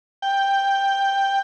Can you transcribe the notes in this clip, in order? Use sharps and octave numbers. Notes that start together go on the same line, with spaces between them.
G5